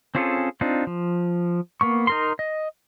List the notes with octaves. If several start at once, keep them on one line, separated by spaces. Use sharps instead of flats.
C4 C#4 F4 G#4 A4
C4 D4 D#4 F4
F3
A#3 B3 C#6
D#4 A#4 C6
D#5